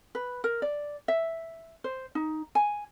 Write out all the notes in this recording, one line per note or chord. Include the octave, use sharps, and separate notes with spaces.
B4
A#4
D5
E5
C5
D#4
G#5